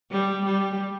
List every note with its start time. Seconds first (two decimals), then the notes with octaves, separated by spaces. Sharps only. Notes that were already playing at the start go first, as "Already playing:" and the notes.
0.11 G3
0.46 G3